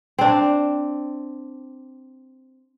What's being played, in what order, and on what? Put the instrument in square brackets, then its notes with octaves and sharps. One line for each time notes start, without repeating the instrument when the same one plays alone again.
[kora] C4 D4